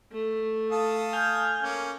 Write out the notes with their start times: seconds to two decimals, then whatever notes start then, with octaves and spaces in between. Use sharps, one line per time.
0.12 A3
0.71 A4 F5 D#6
1.13 G#5 F6 G6
1.62 A#3 C#4